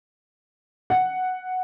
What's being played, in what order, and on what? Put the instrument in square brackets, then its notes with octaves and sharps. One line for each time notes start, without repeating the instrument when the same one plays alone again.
[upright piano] F#5